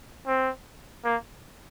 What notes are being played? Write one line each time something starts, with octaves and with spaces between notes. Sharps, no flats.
C4
A#3